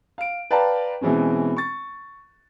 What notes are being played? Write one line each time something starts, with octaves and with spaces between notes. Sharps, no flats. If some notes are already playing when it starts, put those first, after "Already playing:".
F5 D7
B4 D5 F5 G5 A5 A#5
B2 E3 G#3 C4 C#4
C#6 A6